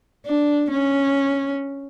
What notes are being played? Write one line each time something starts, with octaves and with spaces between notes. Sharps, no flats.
D4
C#4